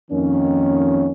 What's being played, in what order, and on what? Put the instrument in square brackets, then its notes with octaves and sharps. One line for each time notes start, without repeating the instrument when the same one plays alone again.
[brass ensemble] F2 D#3 A#3 C#4